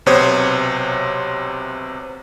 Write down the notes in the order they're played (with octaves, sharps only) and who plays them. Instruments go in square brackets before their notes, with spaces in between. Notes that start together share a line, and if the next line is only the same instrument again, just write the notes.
[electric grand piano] B1 C3 B3 C5 C#5 D#6